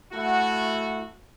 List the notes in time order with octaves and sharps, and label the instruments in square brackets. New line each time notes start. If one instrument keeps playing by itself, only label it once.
[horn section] A3 E4 F#4